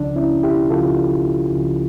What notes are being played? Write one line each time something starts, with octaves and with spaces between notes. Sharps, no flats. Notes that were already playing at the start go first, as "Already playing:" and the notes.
Already playing: C#2 C#3 F3 D4
C#4 E4
E4 G4
C#2 C#3 F3 F4 A4
C#2 C#3 F3